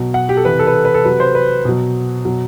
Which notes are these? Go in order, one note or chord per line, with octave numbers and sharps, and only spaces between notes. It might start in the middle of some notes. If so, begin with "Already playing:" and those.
Already playing: B2 F#3
F#5
G4
A4
C3 E3 B4
A4
B4
A4
B4
A4
C3 F#3 B4
C5
B4
B2 F#3
B2 F#3